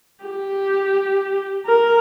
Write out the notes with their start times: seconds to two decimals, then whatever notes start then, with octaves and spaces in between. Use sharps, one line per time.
0.25 G4
1.66 A#4